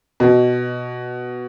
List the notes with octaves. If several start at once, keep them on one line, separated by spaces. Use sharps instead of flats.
B2